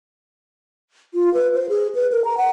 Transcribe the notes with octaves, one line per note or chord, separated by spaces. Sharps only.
F4
B4
C5
G#4
B4
A#4
A#5
F#5